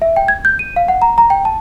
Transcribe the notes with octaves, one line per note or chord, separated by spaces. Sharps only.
E5
G5
G#6
G6
D#7
F5
F#5
A#5
A#5
G5
A5